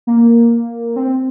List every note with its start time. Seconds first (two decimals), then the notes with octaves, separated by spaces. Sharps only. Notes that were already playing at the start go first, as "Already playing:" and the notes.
0.07 A#3
0.96 C4